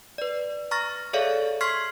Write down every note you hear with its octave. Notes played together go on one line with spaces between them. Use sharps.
B4 D5
A#5 C#6 F6 A6 A#6
G#4 A4 C#5 D5 E5 F5
C6 C#6 F6 G#6 B6 C7